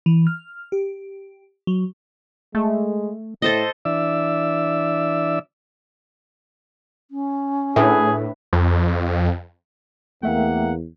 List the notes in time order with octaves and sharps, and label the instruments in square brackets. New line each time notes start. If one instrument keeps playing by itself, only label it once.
[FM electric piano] E3
F6
G4
F#3
[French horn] G#3 [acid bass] A3
[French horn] A2 [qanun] A4 C5 D#5
[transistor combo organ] E3 D4 D5 E5 E6
[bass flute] C#4
[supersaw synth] A2 [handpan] D4 B4 E5 [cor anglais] G#4
[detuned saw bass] F2
[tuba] E2 [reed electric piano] A3 E5 G5 [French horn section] A#3 [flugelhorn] F#5